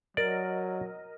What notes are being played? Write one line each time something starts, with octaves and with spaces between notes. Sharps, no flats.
F#3 A#4 D5 D#5